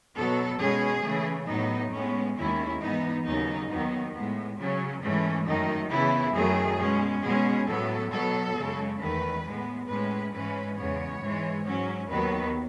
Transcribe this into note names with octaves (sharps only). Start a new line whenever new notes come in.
B2 F#3 B3 A4
B2 G#3 C#4 G#4
C#3 E3 A3
A2 F#3 B3 D#4
A2 G#3 B3 C#4
D#2 D#3 G#3 C#4 E4
G#2 E3 B3 D#4
D#2 C#3 F#3 B3 D#4
D#2 D#3 F#3 B3 D#4
A2 G#3 B3
C#3 F#3 C#4
G#2 E3 A3 C#4
F#2 D#3 A3 D#4
C#3 E3 B3 E4
F#2 D#3 F#3 A3 G#4
B2 G#3 C#4
B2 G#3 C#4 G#4
A2 F#3 B3 A4
B2 F#3 B3 A4
F#2 C#3 G#3
E2 D#3 A3 B4
A2 G#3 B3
A2 G#3 C#4 B4
G#2 E3 G#3 C#4 B4
E2 C#3 G#3 B3 C#5
G#2 E3 G#3
G#2 F#3 C#4
D#2 D#3 F#3 B3 B4